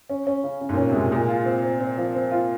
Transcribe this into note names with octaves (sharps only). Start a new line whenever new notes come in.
C#4
C#4
C#3
C#3
G#2
A#2
C#4
C3
G#3
A#2
A#2 G#3
F4
C4
C4
C4
F3
C4
F4